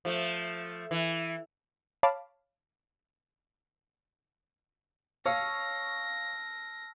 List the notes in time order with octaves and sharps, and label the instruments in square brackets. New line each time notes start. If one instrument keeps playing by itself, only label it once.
[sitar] F3 A3
E3
[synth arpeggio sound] C#5 F5 A5 B5 D6
[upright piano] C#5 F5 C#6 [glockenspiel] A5 E6 F6 [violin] A#6